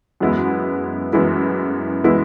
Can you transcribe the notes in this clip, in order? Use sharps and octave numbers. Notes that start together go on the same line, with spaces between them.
F#2 E3 G#3 B3 E4
F#2 E3 G#3 B3 E4
E3 G#3 B3 E4